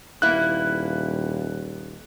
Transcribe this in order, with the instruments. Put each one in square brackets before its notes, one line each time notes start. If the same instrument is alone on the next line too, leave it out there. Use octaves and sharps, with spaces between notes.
[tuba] D#1 [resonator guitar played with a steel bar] A#3 B3 E4 [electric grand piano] F#6